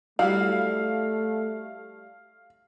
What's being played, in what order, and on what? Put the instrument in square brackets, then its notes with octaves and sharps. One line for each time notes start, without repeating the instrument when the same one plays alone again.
[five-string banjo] G3 E4 F#4 [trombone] A3 [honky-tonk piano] F5